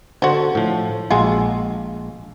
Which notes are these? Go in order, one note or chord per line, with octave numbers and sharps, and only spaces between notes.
D3 F#4 C5
A2 F3
A#1 G#3 F4 F#4 G#4